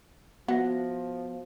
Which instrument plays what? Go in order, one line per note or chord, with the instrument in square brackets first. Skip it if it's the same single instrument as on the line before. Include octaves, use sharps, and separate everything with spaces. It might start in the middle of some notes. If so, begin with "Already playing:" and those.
[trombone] F3 [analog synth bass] B3 [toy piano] F#4 E5 [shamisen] F#5